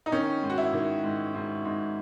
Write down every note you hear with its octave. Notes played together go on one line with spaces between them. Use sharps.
D#4
D#3 C#4
G#2
F#4
E4
D#3
G#2
G#2
G#2